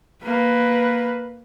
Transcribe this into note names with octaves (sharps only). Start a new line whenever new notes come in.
A#3 B4